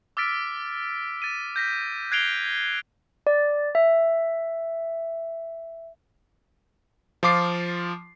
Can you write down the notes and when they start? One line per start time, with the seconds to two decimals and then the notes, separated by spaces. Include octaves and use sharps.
0.17 D6 E6 F6 A6 B6 D7
1.22 A6 B6 D#7
1.56 G6 A#6 B6
2.11 F#6 G#6 C7 D7 F7 G7
3.27 D5
3.75 E5
7.23 F3 F4 D6 C7